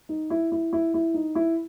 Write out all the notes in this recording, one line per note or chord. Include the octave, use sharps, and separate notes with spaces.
D#4
E4
E4
E4
E4
D#4
E4